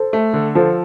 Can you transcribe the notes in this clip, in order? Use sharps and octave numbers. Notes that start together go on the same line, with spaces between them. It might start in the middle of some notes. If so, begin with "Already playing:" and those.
Already playing: A4 C5
A3
D3
F3 A4 C5